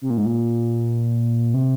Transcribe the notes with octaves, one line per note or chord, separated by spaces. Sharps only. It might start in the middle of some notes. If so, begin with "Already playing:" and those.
C3
A#2
G#2
A#2
C3